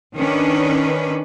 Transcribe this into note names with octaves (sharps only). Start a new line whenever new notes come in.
D#3 C#4 D4 B4